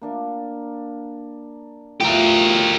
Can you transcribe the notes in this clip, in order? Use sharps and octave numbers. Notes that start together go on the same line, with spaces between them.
A#3 D4 A#4
A2 F3 F#3 G4 A#4